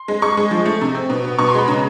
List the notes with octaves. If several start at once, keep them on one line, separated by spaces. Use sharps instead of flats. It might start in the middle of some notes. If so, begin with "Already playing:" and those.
Already playing: C6
G#3
G#3 C#6
G#3
F3
A3
C3
C4
B2
B3
B2 C#6
C6
G#3 B5
C#3 A#5